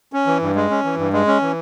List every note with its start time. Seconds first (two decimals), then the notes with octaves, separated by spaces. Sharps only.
0.13 C#4
0.27 E3
0.42 G2
0.56 G#3
0.70 C#4
0.84 E3
0.98 G2
1.13 G#3
1.27 C#4
1.42 E3